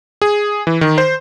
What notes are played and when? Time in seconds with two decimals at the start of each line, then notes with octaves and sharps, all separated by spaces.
0.22 G#4
0.67 E3
0.81 D#3
0.98 C5